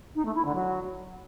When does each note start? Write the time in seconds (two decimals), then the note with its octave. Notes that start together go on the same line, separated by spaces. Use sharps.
0.15 D#4
0.25 A3
0.35 E4
0.45 D3
0.55 F#3